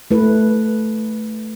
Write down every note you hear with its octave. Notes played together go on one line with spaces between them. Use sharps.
A3 E4 B4